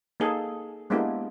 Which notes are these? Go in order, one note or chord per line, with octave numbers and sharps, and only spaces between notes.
A#3 D#4 G#4 A4
G#3 A#3 B3 D4 E4 G4